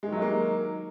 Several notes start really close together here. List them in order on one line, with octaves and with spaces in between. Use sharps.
G#3 D#3 F#3 D#4 A#3